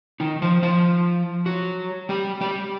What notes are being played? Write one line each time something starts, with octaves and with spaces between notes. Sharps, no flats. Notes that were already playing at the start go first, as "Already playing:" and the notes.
D#3 D#4
F3 F4
F3 F4
F#3 F#4
G3 G4
G3 G4